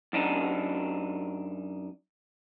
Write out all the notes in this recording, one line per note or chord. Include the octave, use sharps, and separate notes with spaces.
F#2 D4 D#4